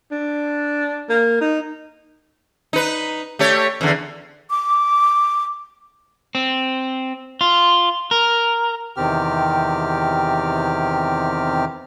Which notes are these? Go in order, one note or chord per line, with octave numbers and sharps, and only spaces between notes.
D4
A#3
D#4
D#4 B4
A3 G4 C#5
E2 D3
D6
C4
F4
A#4
E2 C3 D#3 C4 G4 F6